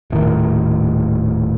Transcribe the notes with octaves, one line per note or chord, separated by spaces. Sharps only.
D#1 A2 D#3